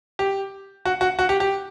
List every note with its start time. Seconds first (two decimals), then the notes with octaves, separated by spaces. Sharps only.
0.19 G4
0.85 F#4
1.01 F#4
1.19 F#4
1.29 G4
1.40 G4